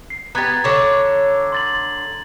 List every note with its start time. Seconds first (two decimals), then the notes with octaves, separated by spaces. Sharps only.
0.10 C7
0.35 B3 G4 A#5 G#6 A6
0.64 D3 C#5
1.52 C6 A6 F#7